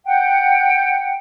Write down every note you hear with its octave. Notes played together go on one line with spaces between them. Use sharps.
F#5 G5